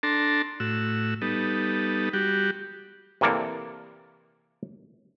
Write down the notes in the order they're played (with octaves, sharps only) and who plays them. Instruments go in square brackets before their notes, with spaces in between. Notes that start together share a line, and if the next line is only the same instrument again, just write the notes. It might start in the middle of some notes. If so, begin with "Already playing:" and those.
[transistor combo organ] D4 A4 A5 A#5 C6
A2 F#4 E6
G3 B3 D#4 A4
G3 F#4 G4
[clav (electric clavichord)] C3 E3 A#3 A4 D5